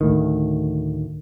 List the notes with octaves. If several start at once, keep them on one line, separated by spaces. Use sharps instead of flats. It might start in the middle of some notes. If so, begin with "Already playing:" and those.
D2 A2 D#3